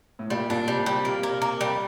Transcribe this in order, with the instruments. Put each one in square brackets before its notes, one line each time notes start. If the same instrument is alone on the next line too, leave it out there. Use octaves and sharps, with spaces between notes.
[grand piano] A2
[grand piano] A#2 [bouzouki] G3
[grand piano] A#2 [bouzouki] D4
[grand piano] C3 [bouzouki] G3
[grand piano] C3 [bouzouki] G3
[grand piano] A#2 [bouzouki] A#3
[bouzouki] A#3
A#3
G3